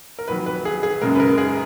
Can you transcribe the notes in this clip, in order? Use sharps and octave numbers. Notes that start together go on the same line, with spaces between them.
A#4
F2 D#3 F#3 B4
B4
G#4
G#4
F#2 C#3 G#3 A#4
B4
A#4
G#4